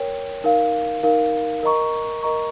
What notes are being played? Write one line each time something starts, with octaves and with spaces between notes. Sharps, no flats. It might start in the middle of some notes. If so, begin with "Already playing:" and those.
Already playing: A#4 C#5 G5
D#4 A#4 F5
D#4 A#4 F5
A#4 D#5 A#5 C#6
A#4 D#5 A#5 C#6